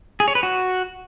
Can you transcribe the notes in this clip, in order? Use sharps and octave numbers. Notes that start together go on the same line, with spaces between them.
G#4
C#5
B4
F#4